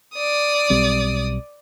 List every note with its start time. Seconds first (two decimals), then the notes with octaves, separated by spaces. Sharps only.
0.15 D5 D#6
0.70 B1 G3 C4